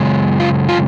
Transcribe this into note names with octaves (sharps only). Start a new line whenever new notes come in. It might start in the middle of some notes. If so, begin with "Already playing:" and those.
Already playing: F#2 C#3 G#3
F4
F4